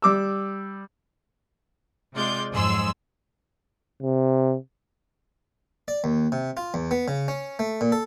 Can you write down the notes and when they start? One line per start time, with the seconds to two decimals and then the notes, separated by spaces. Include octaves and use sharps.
0.02 G3 D6 E6
2.15 C3 G#3 F4 D5 G6
2.52 F2 G#2 F#3 G#4 C6 E6
4.03 C3
5.88 D5
6.04 D#2
6.32 C3
6.57 F4
6.74 E2
6.91 B3
7.08 C#3
7.28 C#4
7.59 A3
7.81 A#2
7.92 A4